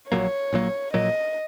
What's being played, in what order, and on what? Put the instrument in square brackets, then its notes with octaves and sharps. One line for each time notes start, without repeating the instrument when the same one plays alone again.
[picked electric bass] A#1 A#2 F#3 A#3 [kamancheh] C#5
[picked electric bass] A#1 A#2 F#3 A#3
[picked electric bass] A#1 A#2 F#3 A#3 [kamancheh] D#5